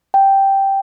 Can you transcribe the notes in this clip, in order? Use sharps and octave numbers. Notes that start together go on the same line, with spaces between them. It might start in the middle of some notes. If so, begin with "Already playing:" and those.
G5